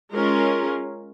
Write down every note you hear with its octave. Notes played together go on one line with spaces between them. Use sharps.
G#3 C#4 F4 A#4